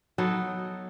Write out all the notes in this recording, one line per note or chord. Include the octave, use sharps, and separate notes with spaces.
F#3 B3 D#4 A4